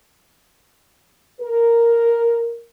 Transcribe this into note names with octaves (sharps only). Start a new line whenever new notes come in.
A#4